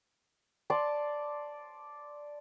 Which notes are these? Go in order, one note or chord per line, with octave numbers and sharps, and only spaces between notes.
D5 A5 C6